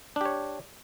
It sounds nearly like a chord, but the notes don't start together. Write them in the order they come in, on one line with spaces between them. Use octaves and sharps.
D4 G4 C#5